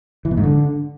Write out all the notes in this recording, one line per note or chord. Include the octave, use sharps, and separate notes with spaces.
E3
B2
G#2
D3